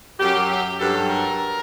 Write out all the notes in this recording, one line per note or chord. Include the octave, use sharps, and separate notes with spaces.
F#2 F#3 G4
G4
G2 F#3 A4
A#4